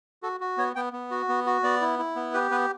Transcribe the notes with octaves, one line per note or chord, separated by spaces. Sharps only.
F#4 A4
F#4
B3 C#5
B3 G5
B3
F#4
B3
F#4
B3 D5
E4
E4
B3
G4 B4
B3 B4